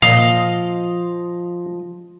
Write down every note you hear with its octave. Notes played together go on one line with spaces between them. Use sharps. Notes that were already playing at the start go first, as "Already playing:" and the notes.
A#2 F3 D#5 F5